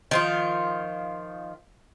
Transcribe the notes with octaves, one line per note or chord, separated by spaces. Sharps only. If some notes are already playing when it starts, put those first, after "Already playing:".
D#3 F3 F4